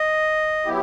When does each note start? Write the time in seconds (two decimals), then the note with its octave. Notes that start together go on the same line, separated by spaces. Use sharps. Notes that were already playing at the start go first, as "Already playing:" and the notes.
Already playing: D#5
0.65 F#3 B3 E4 G4